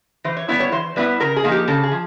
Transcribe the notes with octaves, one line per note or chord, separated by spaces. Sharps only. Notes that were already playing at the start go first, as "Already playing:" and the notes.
E3 C5
C#5
G3 B3 E4 C#5
C#5
E3 C5
G3 B3 E4 B4
C#3 A#4
G#4
F3 A#3 D#4
G4
C#3 A4
G#4
F3